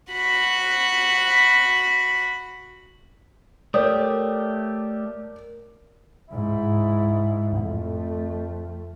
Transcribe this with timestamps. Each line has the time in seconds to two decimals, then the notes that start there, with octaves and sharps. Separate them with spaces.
0.13 F#4 B5
3.74 A3 G4 A#4 C#5 D5 D#6
6.31 G#2 E4
7.58 F2 A3